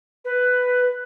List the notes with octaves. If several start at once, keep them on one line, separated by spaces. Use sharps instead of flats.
B4